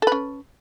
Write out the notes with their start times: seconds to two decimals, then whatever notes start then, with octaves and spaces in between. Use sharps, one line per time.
0.02 A4
0.07 B4
0.12 C#4